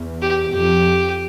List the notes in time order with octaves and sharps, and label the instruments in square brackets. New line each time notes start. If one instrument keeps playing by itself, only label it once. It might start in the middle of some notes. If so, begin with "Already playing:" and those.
Already playing: [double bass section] E2
[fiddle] G4
[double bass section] F2 [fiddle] G4